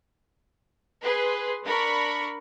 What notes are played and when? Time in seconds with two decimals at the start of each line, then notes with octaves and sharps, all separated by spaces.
1.02 G#4 B4 C6
1.63 D4 A#4 B5 C#6